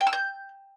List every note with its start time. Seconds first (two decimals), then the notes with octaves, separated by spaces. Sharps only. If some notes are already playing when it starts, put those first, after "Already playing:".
0.01 G5
0.07 E6
0.13 G6